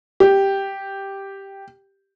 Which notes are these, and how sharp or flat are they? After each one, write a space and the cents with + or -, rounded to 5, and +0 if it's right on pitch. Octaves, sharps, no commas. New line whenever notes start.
G4 +0